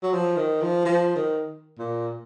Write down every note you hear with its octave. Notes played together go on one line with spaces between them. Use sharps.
F#3
F3
D#3
F3
F3
D#3
A#2